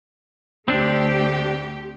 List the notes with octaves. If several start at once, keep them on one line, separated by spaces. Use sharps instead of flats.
D2 A3 C4 D4 G4